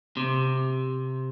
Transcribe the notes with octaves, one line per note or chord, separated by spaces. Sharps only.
C3